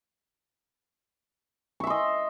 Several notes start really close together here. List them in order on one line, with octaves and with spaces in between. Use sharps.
C#6 E5 C6 D#5